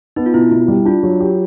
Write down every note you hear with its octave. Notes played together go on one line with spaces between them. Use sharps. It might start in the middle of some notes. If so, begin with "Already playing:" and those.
B3 D#4
F4
B2 E4
B2 E4
G3
D4 F4
F#3
G4